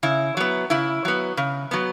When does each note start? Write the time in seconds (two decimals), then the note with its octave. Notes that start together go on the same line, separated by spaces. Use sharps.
0.03 C#3 E4
0.37 F#3 B3
0.70 C#3 E4
1.05 F#3 B3
1.37 C#3
1.71 F#3 B3